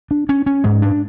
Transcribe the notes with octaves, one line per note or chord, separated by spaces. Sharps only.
D4
C#4
C#4
G#2 G#3
D4